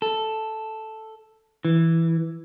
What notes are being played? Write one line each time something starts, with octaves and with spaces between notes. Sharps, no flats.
A4
E3